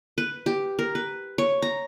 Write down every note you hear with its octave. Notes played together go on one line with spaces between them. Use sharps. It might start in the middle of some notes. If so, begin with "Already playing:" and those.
B4
G4
A#4
B4
C#5
A#5